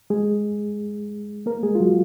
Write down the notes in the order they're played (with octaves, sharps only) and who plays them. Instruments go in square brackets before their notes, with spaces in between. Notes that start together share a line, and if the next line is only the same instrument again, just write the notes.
[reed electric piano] G#3 G#4
A#3 A#4
G#3 G#4
F4
F#3 F#4